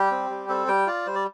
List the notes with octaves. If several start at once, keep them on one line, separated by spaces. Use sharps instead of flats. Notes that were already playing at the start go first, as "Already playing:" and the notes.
Already playing: G3 G4
C4
G3
C4 A4
G3 G5
F4 D5
G3 C5
D5